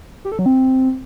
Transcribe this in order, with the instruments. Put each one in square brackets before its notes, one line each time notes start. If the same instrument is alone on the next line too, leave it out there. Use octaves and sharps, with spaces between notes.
[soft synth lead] G4
A4
F#3
C4